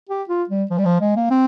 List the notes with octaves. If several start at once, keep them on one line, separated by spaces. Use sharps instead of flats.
G4
F4
G3
F3
G3
F3
G#3
A#3
C4